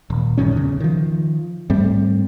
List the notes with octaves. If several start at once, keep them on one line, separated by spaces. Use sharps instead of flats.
D#1
A#1 G2 D#3 C#4
E2 C#3
D#3 F3
G#2 G3 A3 C4